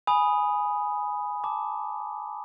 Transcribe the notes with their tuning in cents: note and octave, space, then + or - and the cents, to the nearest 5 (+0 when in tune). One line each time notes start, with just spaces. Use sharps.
G#5 +0 B5 +0 D#6 +0
A5 +10 D6 +0